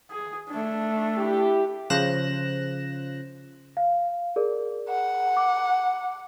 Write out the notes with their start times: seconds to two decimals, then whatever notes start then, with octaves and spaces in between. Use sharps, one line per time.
0.11 G#4
0.50 A3 D4
1.18 E4 G4
1.90 C#3 F3 C5 F#6 A#6 E7
3.77 F5
4.36 G#4 A#4 D5
4.89 F#5
5.37 D6